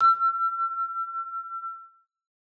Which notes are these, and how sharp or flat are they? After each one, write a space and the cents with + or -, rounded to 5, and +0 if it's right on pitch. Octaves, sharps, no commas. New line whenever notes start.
E6 +35